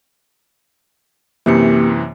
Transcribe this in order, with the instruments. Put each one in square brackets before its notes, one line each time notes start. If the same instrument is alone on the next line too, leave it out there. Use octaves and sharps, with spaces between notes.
[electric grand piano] F#2 C3 E3 [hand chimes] A#3 G4 C#7